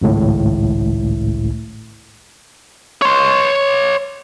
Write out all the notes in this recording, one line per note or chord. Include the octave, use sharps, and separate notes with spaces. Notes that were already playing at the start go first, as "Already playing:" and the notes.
G#1 C#2 A2
C#5 C6